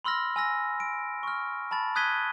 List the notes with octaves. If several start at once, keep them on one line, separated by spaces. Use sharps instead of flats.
B5 C6 E6 F6 A#6
G#5 E6 A#6
D7
C#6 F6
A5 B5 A6
D#6 F#6 G#6 B6 D#7 G7